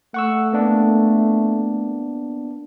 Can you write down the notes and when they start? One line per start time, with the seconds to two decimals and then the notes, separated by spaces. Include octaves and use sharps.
0.14 A3 F#5 C#6 E6
0.53 A#3 B3 D4